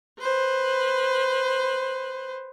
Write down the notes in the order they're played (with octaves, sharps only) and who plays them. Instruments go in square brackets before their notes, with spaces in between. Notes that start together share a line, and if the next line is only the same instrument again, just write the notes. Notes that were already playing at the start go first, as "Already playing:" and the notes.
[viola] B4 C5